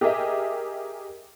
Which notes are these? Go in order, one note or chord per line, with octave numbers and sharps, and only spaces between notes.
G4 G#4 A#4 D#5 E5